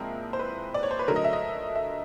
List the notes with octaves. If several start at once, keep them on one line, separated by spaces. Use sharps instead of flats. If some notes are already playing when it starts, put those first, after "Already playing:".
Already playing: A#2 F3 G#3 C4 E4 A#4
C5
B4
D5
C#5
C5
B4
D3 F#3 A3 A#4
D#5
E5
D#5
E5